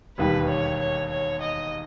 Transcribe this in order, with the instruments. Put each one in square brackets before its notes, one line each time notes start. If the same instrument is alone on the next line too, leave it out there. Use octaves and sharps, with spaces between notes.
[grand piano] E1 D#2 D#3 G3 [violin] B4
[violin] C#5
C#5
C#5
D#5